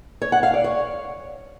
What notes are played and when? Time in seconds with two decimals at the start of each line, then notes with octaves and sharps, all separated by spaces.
0.22 C#5
0.32 F#5
0.43 F5
0.54 D5
0.64 C#5